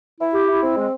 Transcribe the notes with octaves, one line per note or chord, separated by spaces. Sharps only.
E4
G4
E4
C4
G#3